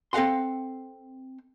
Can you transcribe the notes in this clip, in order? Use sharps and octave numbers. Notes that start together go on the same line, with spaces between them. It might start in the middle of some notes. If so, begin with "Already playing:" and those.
C4 A4 F5 F#5 C6